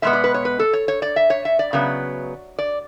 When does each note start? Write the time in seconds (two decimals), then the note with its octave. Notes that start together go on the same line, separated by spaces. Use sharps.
0.02 B2 G#3 B3 E5
0.13 D5
0.24 B4
0.34 C#5
0.45 B4
0.59 A4
0.73 C#5
0.88 C#5
1.02 D5
1.16 E5
1.30 C#5
1.45 E5
1.59 D5
1.73 C#3 F#3 B3
2.59 D5